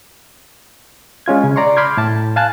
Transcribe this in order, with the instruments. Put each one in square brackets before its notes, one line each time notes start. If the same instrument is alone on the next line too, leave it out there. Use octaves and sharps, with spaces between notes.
[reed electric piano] G#3 C#4 F4 G#6
C#3
D5 A#5 C6 C#6
B5 C6 D6 F6 G6 G#6
A2 A5
F5 G#5 A5 F#6